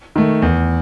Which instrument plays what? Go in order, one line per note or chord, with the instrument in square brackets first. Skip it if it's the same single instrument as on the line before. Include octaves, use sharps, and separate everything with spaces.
[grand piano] D#3 A3
E2